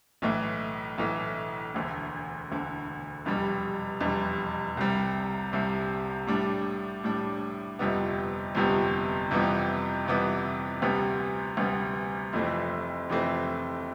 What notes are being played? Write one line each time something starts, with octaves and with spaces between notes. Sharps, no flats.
B1 A2 E3 A3
B1 A2 E3 A3
E1 D2 D3
E1 D2 D3
F1 E2 B2 G3
F1 E2 B2 G3
C2 C3 G3
C2 C3 G3
A2 G3 D4
A2 G3 D4
G1 F2 C3 G3 B3
G1 F2 C3 G3 B3
F2 C3 E3 G3 B3
F2 C3 E3 G3 B3
D2 C3 G3 B3
D2 C3 G3 B3
F1 F2 E3 A3 C4
F1 F2 E3 A3 C4